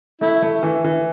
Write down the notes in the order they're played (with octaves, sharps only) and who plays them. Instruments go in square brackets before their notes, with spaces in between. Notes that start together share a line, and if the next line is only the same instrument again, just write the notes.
[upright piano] A3 [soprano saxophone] E4
[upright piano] A3
E3
E3